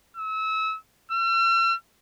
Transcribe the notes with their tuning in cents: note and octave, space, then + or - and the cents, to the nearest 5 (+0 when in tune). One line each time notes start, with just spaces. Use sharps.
E6 -30
E6 +45